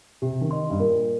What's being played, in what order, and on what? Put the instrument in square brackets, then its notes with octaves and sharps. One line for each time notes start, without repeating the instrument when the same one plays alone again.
[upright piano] C3 [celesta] G4
[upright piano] D#3
[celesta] D#5 C6
[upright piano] G2
[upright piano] A#2 [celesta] A#4